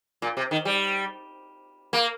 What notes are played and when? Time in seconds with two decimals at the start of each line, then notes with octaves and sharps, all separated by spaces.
0.22 A#2
0.37 C3
0.51 D#3
0.65 G3
1.93 A#3